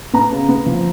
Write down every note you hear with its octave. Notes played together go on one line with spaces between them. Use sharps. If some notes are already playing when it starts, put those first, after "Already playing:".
B3 A#5
C#3
B3
F3